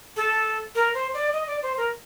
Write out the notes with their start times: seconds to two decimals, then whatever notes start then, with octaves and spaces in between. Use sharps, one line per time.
0.17 A4
0.75 A#4
0.94 C5
1.14 D5
1.33 D#5
1.47 D5
1.63 C5
1.77 A#4